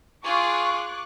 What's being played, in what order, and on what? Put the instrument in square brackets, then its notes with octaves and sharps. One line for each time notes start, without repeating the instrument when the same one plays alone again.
[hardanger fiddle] F4 G#4 [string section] C#6 D6 F#6